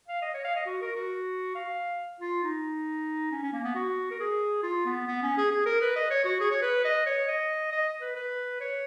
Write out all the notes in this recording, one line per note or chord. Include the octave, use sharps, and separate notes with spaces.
F5
D#5
C#5
F5
D#5
F#4
A#4
F#4
F5
F4
D#4
C#4
C#4
A#3
B3
F#4
A#4
G#4
F4
B3
B3
C#4
G#4
G#4
A#4
B4
D#5
C#5
F#4
G#4
C#5
B4
D#5
C#5
D#5
D#5
B4
B4
C#5